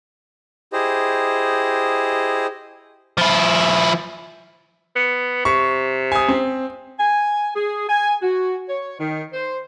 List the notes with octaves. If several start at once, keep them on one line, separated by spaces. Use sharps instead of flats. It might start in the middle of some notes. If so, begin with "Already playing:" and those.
E4 G4 G#4 C5 D#5
F3 E4
B3
C3 C#6
G#5 D#6
C4
G#5
G#4
G#5
F#4
C#5
D#3
C5